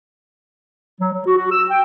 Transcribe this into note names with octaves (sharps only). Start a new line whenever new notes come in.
F#3
F#3
F#4
F#4
E6
G5